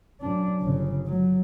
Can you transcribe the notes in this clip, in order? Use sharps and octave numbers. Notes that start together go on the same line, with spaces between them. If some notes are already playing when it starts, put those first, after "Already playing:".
F#2 D4
G1 C#3
F#3